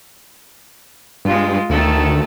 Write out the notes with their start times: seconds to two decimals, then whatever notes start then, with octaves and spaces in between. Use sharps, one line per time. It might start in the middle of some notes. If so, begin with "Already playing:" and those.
1.25 G2 G#3 F4
1.70 D2 D#3 A3 A4